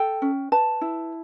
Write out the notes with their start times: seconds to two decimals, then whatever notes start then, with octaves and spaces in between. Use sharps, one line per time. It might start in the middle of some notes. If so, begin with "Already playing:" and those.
Already playing: A4 G5
0.22 C#4
0.52 B4 A5
0.81 E4